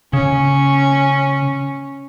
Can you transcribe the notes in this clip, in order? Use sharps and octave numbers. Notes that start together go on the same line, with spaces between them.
C#3 C#4